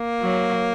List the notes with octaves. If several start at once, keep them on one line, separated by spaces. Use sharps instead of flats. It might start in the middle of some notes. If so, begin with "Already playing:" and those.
Already playing: A#3
F#3